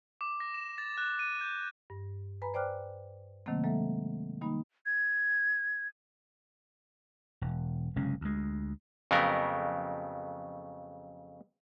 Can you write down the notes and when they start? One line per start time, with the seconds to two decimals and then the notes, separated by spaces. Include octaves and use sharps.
0.21 D6
0.40 A#6
0.54 E7
0.78 A6
0.97 F#6
1.19 D#7
1.41 G6
1.90 G2
2.42 B4 G#5 A#5 B5
2.54 C5 D5 G5 D6 F6 F#6
3.46 C3 D#3 F#3 A3 A#3 C4
3.64 F#3 G#3 A#3 A4 E5
4.41 D#3 G3 A#3 D#4 B5
4.86 G#6
7.41 E1
7.96 F#1 C3 G#3 C#4
8.21 D2 G#3
9.11 F2 C#3 F#3 A3 B3 A#4